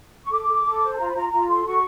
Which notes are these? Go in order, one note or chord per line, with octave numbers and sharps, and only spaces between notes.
C#6
A4 D6
A4
A4
C5
A5
F4 A#5
B5
F4 A#5
F4 A#5
A4 C6
F#4 C#6